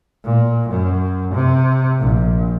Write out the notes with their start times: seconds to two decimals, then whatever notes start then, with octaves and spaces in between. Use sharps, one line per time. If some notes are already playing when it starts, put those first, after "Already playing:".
0.25 A#2
0.70 F#2
1.34 C3
2.00 A#1